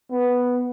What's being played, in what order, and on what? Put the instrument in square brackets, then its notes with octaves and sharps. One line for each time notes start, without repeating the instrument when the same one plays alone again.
[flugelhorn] B3